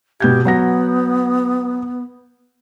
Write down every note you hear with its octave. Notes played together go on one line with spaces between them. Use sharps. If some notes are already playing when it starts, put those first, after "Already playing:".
B2 G4 G6 G#6
F#3 B3 F#5 A#6